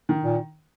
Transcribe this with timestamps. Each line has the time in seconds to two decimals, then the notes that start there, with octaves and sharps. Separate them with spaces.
0.09 D#3
0.24 A#2